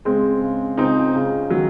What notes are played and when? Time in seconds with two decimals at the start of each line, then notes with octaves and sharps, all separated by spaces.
0.05 C#3 G#3 C4
0.41 C#3
0.78 C#2 C4 D#4
1.15 C#3
1.50 D#3 F#3